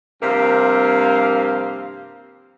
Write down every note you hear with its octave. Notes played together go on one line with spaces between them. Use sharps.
G2 C3 F3 A#3 F5